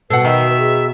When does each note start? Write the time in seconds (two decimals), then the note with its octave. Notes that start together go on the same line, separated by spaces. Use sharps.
0.10 B2 A4 B4 F#5 C7
0.25 D#3 E5
0.58 G#4